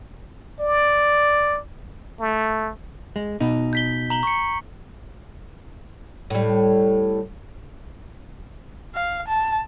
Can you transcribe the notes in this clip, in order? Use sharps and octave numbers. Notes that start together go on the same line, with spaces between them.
D5
A3
G#3
B2 D#4
G6 B6 G7
A#5 F#7 G7
C#6 C#7
A2 G3
F5
A5